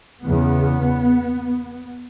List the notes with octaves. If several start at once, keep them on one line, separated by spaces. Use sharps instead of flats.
E2 C#3 B3